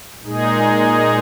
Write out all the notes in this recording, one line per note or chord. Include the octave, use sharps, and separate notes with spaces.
A#2 G#3 D#4 G#4